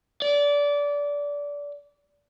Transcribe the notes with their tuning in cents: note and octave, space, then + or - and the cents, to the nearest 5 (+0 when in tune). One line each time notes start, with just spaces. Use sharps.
D5 -20